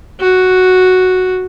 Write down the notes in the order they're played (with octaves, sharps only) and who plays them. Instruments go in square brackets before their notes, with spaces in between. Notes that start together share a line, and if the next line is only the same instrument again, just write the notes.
[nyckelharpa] F#4